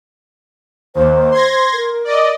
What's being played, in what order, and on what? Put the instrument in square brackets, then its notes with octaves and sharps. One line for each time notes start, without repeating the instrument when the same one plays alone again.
[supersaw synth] D#2 [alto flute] C5
[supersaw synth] C6 G#6 A#6
[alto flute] A#4
[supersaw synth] D5 D#5